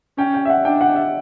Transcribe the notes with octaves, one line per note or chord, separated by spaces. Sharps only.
C#4 G5
G5
E5
F#5
D4 G5
F#5
E5